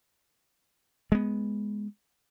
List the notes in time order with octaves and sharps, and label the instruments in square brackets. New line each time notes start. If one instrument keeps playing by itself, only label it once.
[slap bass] G#3 B3